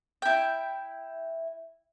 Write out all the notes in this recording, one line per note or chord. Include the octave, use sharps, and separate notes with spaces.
E4 G5